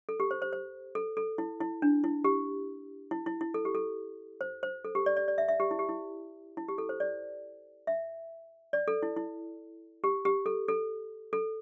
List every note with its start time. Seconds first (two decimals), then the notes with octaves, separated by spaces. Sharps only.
0.09 A4
0.20 G4
0.31 C5
0.42 C5
0.53 C5
0.95 A4
1.17 A4
1.38 E4
1.61 E4
1.82 D4
2.04 E4
2.24 G4
3.11 E4
3.26 E4
3.41 E4
3.54 A4
3.65 G4
3.75 A4
4.41 C5
4.63 C5
4.85 A4
4.95 G4
5.06 D5
5.17 D5
5.28 D5
5.38 E5
5.49 E5
5.60 G4
5.71 E4
5.79 G4
5.89 E4
6.57 E4
6.68 G4
6.78 A4
6.89 C5
7.00 D5
7.87 E5
8.73 D5
8.88 A4
9.03 E4
9.17 E4
10.04 G4
10.25 G4
10.46 A4
10.68 A4
11.33 A4